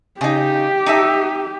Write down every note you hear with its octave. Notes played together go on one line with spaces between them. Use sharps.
C#3 D#4 G4
D#4 A4 E5